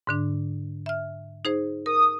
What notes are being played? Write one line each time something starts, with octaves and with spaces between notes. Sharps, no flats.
G#2 D3 D4
E5 F6
D#4 G#4 C5
A#4 D#6